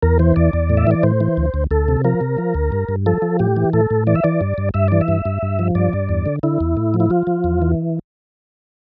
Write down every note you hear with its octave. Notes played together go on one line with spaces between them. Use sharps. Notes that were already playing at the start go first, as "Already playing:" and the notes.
E2 A#4
E3 C5
E2 D5
E2
A2
E5
E3 D5
A2 C5
E3
D2
D2
D2 A4
C3
F3 A#4
C3
F3
D2
G2
G2
F3 A4
F3
A2 G4
E3
A2 A4
A2
E3 D5
E5
E3 D5
G2
G2
G2 E5
E3 D5
E5
G2
G2
G2
F3
G2 D5
G2
E2
D3
D3 E4
E2
A2
F3
E4
F3 F4
F3
E2
E3